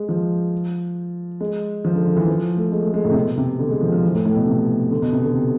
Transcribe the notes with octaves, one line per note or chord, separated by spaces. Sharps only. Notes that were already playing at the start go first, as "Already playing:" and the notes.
Already playing: G#3
F3
G#3
F3
D3
D3
E3
F3
A3
G#3
A3
G#3
A2
C3
B2
C3
D3
G#3
F3
F3
E3
A2
A2
B2
C3
D3
B2
C3
D3
C3